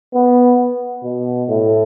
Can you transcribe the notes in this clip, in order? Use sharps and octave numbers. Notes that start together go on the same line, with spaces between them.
B3
B2
A2